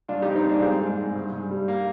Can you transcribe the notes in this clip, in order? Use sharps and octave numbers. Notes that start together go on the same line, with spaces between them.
G2 D4 F4
D#4 G4
F3
C4 D#4
G2 A#3 D4
G3 G#3 C4
G#2
G#2
G2
G2
G3
A#3